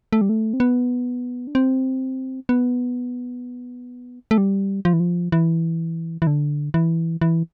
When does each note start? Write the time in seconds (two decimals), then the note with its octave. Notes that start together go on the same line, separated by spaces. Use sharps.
0.13 A3
0.21 G3
0.29 A3
0.54 C4
0.60 B3
1.47 D4
1.55 C4
2.49 B3
4.31 A3
4.38 G3
4.85 F3
4.93 E3
5.00 F3
5.32 E3
6.22 E3
6.27 D3
6.74 E3
7.21 E3